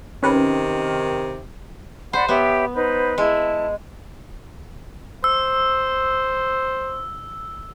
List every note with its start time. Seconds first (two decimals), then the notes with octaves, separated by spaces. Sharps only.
0.23 C3 D#3 C#4 B4
2.13 C5 D5 F#5 B5
2.28 B3 G4 C#5 E5
2.74 D#4 B4 C5
3.18 G#3 E4 A5
5.24 C5 E6